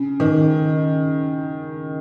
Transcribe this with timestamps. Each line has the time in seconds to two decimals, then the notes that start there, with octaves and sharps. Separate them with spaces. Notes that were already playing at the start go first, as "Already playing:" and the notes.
Already playing: C#3
0.20 D#3